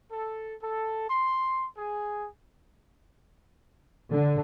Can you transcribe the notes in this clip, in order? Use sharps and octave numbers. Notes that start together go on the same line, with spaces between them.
A4
A4
C6
G#4
D3